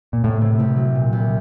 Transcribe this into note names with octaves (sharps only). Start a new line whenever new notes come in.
A#2
A2 C3
C3
C2
F#3
A#2
C2